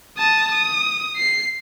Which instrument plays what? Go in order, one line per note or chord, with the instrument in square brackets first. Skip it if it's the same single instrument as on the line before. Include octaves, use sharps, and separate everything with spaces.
[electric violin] A5 D#6
D#6
C7